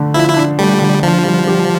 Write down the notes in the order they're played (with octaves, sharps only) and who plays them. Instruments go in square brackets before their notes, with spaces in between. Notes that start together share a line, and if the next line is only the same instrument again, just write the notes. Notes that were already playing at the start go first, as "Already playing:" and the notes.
Already playing: [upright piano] D3 A3 D4
[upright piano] F3 [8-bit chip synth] E4
[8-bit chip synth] E4
[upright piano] D4
[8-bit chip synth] G3 [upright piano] A3
[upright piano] D3
[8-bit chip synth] F3 [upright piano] D4
[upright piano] G3
G4